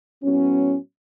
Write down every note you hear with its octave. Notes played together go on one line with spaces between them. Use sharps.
A2 F#3 B3 C#4